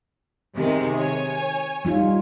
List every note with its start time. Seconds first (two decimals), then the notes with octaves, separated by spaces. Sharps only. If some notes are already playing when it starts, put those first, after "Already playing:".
0.54 C3 D#3 G#3
0.98 C#5 G#5
1.85 G3 D#4 F4